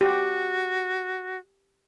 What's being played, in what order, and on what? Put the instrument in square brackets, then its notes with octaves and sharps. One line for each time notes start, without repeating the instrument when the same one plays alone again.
[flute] F#4 [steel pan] G4